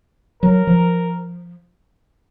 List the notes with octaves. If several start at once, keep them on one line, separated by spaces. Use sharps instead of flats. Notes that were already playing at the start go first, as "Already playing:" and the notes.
F#3 A#4
F3